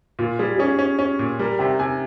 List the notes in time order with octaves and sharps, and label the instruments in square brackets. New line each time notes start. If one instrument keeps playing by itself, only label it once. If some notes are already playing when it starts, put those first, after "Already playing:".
[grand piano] A#2 [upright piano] F4
[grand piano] G3 [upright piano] G#4
[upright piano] G4
[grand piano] C#4 [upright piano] G#4
[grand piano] C#4
C#4
A#2
[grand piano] G3 [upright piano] A#4
[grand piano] C3 [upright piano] G5
[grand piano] C3 [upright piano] G#5